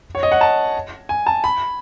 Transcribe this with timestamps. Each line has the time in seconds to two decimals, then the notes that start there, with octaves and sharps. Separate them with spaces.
0.15 C#5
0.23 D#5
0.32 F#5
0.41 A5
1.09 G#5
1.27 A5
1.44 B5